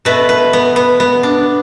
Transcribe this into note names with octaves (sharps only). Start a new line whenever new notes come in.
B2 A3 B4
B4
B3
B3
B3
D4